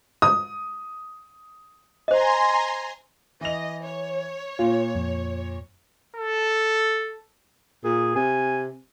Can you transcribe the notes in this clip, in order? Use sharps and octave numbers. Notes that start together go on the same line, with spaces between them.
D#6
C5 D#5 G#5 A#5 C6
E3 D#5 F7
C#5
A#2 F4
F2
A4
A#2 G#4
C3 G#5